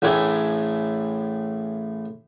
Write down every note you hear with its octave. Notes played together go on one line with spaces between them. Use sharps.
A1 A2 D4 G#4 C#5 E5